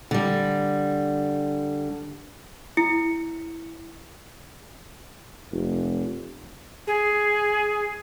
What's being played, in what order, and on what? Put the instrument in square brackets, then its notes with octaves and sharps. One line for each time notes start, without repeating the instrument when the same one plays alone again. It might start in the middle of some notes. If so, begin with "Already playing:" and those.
[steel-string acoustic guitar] D3 G3
[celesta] E4 C#7
[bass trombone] F1
[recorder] G#4